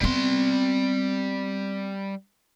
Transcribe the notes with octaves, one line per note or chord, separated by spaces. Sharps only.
G3 B3 C4 C6